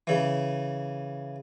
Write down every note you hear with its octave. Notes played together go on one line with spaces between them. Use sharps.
C#3 E3